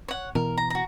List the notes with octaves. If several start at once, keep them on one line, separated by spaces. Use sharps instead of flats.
C#5 F#5
B2 E3 A#4
A#5
F#4 A#5